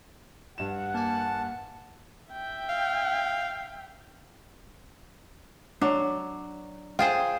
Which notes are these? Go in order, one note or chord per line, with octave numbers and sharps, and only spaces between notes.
G2 F#5 E7
A#3 G#5 A5
E5 G5
F5
F#3 D4
F4 G#4 C5 G5